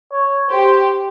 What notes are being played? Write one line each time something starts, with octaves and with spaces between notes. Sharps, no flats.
C#5
G4 C5